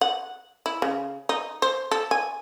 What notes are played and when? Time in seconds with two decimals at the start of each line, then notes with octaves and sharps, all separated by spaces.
0.01 F#5
0.66 E4
0.82 C#3
1.29 D#4
1.62 C5
1.91 A4
2.11 G#5